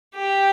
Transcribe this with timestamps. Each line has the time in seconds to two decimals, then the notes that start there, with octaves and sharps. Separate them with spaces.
0.16 G4